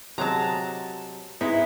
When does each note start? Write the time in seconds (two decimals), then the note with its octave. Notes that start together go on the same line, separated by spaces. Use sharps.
0.18 C3 F#3 G#3 A5 A#5
1.41 G#3 B3 D#4 E4